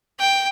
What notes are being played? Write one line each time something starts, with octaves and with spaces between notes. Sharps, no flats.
G5